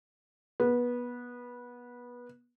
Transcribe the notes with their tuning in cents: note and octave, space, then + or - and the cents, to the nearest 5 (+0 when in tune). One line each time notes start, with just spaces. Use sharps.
B3 -20